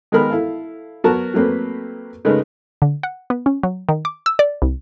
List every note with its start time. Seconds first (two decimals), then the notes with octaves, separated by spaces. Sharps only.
0.12 D#3 G#3 B3 A#4 B5 F6
0.30 E4 A4 F5
1.04 F#3 B3 F#4 A#4 A5 A#5
1.34 F#3 A3 A#3 C4 B4
2.25 C#3 G#3 A3 D#4 A#4 B4
2.82 D3
3.03 F#5
3.30 B3
3.46 C#4
3.63 F#3
3.89 D#3
4.05 D6
4.26 E6
4.39 D5
4.62 C2